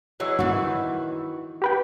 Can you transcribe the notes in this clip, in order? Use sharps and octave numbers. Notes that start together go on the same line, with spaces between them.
E3 F#3 G#3
D#3 E3 F#4
G4 B4 G5